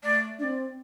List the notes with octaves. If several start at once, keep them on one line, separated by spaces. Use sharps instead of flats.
A3 D5
C4 D4 D5